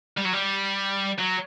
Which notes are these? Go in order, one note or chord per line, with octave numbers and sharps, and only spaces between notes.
G3
F#3
G3
F#3